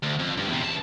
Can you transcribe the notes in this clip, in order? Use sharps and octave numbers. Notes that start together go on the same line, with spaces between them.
D2
F2
G2
E2 C3
C#2 A5